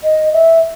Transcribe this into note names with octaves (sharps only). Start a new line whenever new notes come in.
D#5
E5